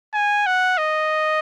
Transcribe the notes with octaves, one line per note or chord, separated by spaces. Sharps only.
G#5
F#5
D#5